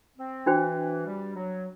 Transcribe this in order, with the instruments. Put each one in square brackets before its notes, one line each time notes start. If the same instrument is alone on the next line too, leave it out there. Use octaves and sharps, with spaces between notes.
[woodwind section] C4
[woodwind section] E3 [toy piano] D4 F#4 C5 G5
[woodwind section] G3
F#3